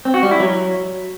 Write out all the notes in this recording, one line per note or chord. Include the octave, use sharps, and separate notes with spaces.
C4
F#4
G3
E4
F#3